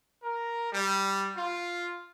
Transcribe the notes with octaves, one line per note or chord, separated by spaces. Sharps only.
A#4
G3
F4